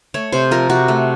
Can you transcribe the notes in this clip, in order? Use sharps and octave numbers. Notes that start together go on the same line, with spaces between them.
A3 C#5
C3 C5
F3 A#4
C3 F#4
A3